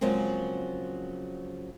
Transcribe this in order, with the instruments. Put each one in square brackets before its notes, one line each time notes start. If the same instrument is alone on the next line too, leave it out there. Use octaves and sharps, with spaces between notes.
[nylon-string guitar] C#3 F3 F#3 G#3 A#3 C4